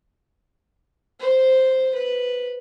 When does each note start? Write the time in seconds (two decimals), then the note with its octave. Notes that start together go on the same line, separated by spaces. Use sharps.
1.20 C5
1.95 B4